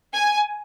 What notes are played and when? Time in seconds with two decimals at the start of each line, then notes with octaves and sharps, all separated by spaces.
0.13 G#5